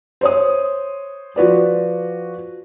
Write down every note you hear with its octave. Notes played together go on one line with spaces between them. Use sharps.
C5 C#5 D#6
F3 F#4 B4 D5